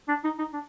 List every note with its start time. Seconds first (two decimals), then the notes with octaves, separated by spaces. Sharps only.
0.08 D4
0.24 D#4
0.39 D#4
0.53 D4